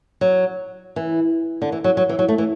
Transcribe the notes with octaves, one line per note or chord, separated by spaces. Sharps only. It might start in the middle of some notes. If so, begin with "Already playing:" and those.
F#3
E3
D3
E3
F#3
F#3
E3
F#3
A3
E3